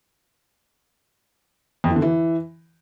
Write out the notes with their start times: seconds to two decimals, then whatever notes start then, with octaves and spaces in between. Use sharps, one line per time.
1.84 F2
1.90 E3
1.96 D3
2.02 E3